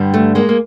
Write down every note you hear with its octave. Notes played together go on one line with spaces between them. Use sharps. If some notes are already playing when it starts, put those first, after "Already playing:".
Already playing: G2 D3 G3
A3
G#3 A#3
A#3